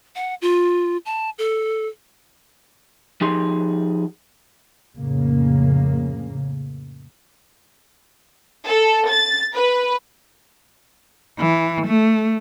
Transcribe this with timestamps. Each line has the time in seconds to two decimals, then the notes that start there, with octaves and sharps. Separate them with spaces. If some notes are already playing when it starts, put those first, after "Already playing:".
0.16 F#5
0.42 F4
1.06 A5
1.38 A4
3.21 F3 D#4 G4 G#4 C6
4.98 F2 A2 C#3 A#3
8.66 A4
9.11 A6
9.55 B4
11.39 E3
11.87 A3